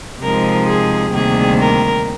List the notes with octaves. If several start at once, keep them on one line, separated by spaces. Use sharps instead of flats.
C3 F3 G#3 D#4 A#4
G#4
D2 C3 D#3 G3 A#3 G#4
A#4